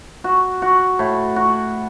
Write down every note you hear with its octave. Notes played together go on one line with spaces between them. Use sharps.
F#4
F#4
A2
F#4